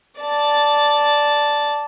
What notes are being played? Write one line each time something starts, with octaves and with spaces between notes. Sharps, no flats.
D5 A5